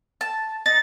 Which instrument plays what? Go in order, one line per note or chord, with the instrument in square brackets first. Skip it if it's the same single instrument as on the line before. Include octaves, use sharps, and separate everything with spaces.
[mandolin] A5
[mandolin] D#4 [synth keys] A6